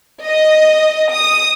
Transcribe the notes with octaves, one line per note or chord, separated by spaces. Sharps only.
D#5
D#6